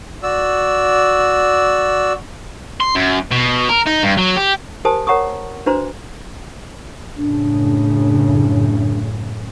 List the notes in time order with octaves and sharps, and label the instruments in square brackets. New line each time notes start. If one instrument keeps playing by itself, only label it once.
[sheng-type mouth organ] F#4 D5 E6
[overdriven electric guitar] C6
F#2
B2
A#4
D#4
G2
F#3
G4
[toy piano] G4 A#4 C5 G#5 A5 D#6
A#4 C#5 F#5 A#5 C#6 D#6
D4 F#4 B4 C5 A#5 C6
[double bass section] F#2 A2 C#3 [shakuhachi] D4